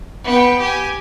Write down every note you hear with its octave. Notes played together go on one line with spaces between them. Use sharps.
B3 G5
G4 G#5